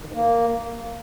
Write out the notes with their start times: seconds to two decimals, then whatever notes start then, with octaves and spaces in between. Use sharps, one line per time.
0.01 D#3
0.07 G#2
0.14 A#3